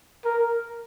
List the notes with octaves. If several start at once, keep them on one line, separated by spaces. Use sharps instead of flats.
A#4